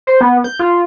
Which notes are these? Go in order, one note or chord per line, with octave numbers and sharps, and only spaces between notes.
C5
B3
G6
F4